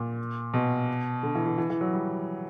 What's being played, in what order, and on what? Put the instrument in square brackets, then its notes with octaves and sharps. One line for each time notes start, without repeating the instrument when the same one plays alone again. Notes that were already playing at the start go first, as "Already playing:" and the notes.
Already playing: [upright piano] A#2
B2
D3
E3
E3
E3
E3
F#3
G3